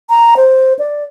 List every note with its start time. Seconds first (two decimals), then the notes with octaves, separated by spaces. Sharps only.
0.10 A#5
0.37 C5
0.79 D5